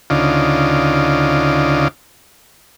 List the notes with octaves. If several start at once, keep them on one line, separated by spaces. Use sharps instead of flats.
D2 C#3 D#4 F4 D5